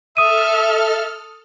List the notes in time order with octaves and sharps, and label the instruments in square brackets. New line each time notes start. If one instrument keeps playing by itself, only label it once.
[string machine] A4 F6 [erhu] E5 [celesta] D#6 D#7